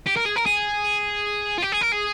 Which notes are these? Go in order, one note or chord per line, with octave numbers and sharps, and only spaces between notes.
G4
A#4
G#4
A#4
G#4
F4
G4
G#4
A#4
G#4